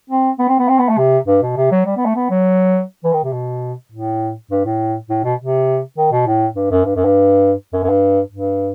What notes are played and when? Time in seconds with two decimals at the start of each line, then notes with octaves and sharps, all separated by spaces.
0.10 C4
0.39 B3
0.48 C4
0.59 B3
0.68 C4
0.79 B3
0.89 A3
0.98 C3
1.27 G2
1.42 B2
1.57 C3
1.72 F#3
1.86 G3
1.97 B3
2.05 A3
2.16 B3
2.30 F#3
3.04 E3
3.13 D#3
3.24 C3
3.33 B2
3.92 A2
4.51 G2
4.65 A2
5.09 A2
5.24 B2
5.39 C3
5.98 D#3
6.12 B2
6.27 A2
6.56 G2
6.71 F#2
6.85 G2
6.96 F#2
7.05 G2
7.73 F#2
7.83 F#2
7.89 G2
8.32 G2